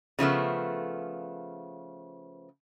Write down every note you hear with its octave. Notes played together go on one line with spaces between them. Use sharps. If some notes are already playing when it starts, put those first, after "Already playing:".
C#3 F3 A3 B3